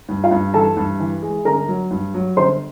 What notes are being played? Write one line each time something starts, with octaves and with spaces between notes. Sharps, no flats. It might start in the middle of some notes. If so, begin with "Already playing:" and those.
G2
F4 F5
G2
E3 A4 A5
G2
E3
G#3
G1 A#4 A#5
F#3
G2
F#3
G1 C5 C6